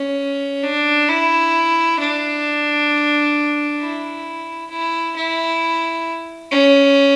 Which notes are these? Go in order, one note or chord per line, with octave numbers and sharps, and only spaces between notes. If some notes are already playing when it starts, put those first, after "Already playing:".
Already playing: C#4
D4
E4
D4
E4
E4
E4
C#4